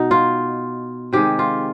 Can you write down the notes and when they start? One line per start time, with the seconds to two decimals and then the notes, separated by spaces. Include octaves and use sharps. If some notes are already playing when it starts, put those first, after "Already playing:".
Already playing: B2 D#4
0.11 F4
1.13 C3 D#3 G#3 G4
1.39 F4